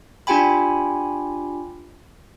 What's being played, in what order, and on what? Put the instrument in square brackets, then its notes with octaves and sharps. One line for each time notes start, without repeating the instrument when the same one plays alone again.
[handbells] D4 F4 G4 G5 G#5 B5